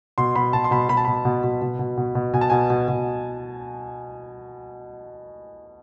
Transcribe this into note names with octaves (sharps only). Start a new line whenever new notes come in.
B2 C6
B2 B5
B2 A5
C6
B2 B5
B2 B5
A5
B2 B5
B2
B2
B2
B2
B2
B2
B2 G#5
A5
B2 G#5
B2
B2